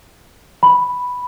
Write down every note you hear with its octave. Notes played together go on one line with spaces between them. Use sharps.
B5